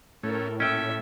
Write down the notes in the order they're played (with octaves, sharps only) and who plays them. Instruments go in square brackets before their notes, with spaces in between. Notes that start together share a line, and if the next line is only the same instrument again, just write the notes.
[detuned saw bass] A2 [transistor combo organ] A3 C#4 [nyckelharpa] A4 A#4
[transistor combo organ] A#2 [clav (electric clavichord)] C#4 G5 [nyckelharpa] A4 E5